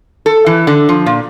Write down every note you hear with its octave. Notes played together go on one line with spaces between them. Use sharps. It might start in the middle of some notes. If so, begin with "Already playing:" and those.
A4
E3
D3
F3
A#2